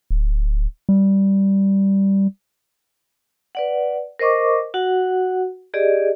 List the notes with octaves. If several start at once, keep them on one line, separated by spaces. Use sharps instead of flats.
D1
G3
B4 D5 F#5
A#4 C5 D#5 C#6 D6
F#4 F#5
G4 G#4 D5 D#5